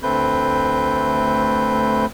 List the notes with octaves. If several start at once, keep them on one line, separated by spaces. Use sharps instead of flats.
D2 A3 C4 B4 G6